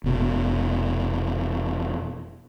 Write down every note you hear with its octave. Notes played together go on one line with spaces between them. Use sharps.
F1 B2